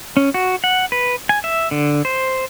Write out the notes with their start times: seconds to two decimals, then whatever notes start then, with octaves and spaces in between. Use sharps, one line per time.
0.17 C#4
0.34 F#4
0.64 F#5
0.92 B4
1.29 G#5
1.44 E5
1.71 D3
2.05 C5